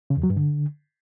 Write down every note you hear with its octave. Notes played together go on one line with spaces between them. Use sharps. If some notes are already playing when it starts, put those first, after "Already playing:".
C#3
E2
F#3
G2
D3